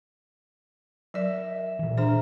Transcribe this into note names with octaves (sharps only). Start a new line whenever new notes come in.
F#3 A#4 D5 E5
A#2 E3
D4 G#4 C5 E5 A#5